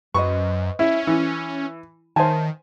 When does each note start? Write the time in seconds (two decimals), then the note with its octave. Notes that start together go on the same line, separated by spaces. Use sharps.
0.14 F#2 B4 C5 D#5 C#6
0.79 C#4 E4
1.07 E3
2.16 D#3 C5 C#5 E5 G#5 A5